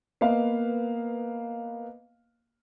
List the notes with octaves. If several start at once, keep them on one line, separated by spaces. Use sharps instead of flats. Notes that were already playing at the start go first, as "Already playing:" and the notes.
A#3 B3 B4 D#5 F5